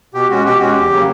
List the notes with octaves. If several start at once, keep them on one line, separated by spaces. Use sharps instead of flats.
B2 G4
G#3 C#4 F#4
B2 G4
G#3 C#4 F#4
G4
E2
C#3 F#3 A#3